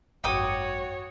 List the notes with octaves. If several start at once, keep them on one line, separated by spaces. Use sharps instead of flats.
G#1 F#2 F#4 C#5 G5 D6 D#6